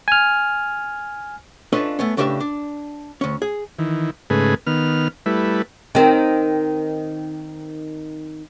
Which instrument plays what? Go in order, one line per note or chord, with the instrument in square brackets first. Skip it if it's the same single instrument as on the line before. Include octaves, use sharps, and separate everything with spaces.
[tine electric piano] G#5 F6
[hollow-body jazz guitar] C#4 D4 F4 A4 B4 D#5
A3 B3 C#4
A2 C#3 D4 G4 B4 E5
D4
D2 C#4
G#4
[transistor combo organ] D#3 E3
G#2 C#3 A3 G#4 B4
D#3 B3 F6
G3 A3 E4 B4
[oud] D#3 C4